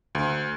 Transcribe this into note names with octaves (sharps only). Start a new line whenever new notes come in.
D2